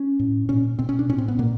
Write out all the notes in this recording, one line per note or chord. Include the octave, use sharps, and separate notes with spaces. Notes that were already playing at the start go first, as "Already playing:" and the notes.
Already playing: C#4
A2
A#2 C#4
B2 C4
C#4
D4
A2 C#4
C4
B3
A#2 A#3